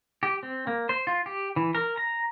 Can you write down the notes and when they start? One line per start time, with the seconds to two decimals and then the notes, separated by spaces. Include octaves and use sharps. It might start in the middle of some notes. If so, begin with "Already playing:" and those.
0.23 G4
0.43 C4
0.67 A#3
0.89 C5
1.07 F4
1.26 G4
1.56 E3
1.75 A#4
1.97 A#5